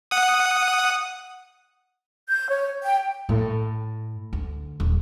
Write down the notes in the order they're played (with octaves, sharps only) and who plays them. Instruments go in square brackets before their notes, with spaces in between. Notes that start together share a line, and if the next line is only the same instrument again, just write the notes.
[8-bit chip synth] F#5 D#6
[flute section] G6
C#5
G5
[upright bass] A2
D2
D#1